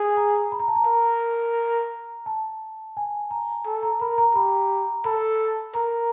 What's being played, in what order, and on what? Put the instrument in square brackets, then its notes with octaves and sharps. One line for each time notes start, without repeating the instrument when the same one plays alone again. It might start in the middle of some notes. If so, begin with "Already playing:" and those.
Already playing: [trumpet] G#4
[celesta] A#5
B5
A#5
A5
A#5
[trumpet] A#4
[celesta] A5
G#5
A#5
[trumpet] A4
[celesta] A#5
[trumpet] A#4 [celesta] B5
[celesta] A#5
[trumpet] G4 [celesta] B5
[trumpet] A4 [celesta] B5
[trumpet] A#4 [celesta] A#5